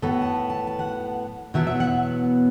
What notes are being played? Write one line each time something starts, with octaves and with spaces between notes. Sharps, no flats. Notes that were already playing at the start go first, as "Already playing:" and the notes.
A2 F#3 B3 A4
A5
A5
A5
F#5
E2 B2 F#3 B3 E5
E5
F#5